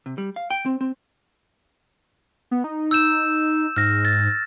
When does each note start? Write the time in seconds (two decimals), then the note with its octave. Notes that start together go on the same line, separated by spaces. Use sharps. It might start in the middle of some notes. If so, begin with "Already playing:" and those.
0.06 C3
0.18 G3
0.36 F5
0.50 G5
0.66 C4
0.81 C4
2.51 B3
2.64 D#4
2.91 E6 G6 E7
3.76 G#2 F6 A#6
4.05 A6